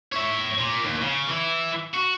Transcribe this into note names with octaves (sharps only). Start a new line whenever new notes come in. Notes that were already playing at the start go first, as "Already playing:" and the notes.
C#5 E5
A#2
D#2
C#3
E3 E4
F#4